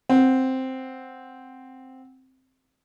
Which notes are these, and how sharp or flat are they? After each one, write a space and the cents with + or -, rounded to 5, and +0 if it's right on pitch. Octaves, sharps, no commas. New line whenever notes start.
C4 +0 F#5 +0